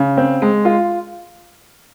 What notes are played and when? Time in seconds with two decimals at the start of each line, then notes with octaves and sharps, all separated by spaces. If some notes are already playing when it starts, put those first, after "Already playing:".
Already playing: C#3
0.17 C4
0.42 G#3
0.65 F4